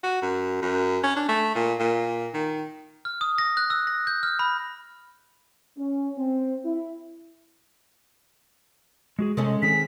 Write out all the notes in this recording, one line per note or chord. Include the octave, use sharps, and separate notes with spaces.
F#4
F#2
F#2
C#4
D4
A3
A#2
A#2
D#3
F6
D#6
A#6
F#6
E6
A#6
G6
F6
B5
C#4
C4
E4
G#3 F#4 G#4
C3 G#3 A3 C#4
D#3 C4 G#4 B6